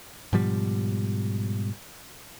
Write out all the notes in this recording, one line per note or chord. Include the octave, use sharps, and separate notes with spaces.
G#2 B2 F3 G3